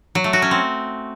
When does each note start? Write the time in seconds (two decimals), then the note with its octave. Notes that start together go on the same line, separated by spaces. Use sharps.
0.15 F#3
0.24 A3
0.33 F#4
0.42 C#4
0.51 C4